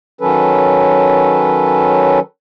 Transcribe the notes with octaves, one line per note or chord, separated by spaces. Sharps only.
D#3 F#3 C#4 A4 B4